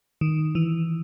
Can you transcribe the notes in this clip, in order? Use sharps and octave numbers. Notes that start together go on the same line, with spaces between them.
D#3
E3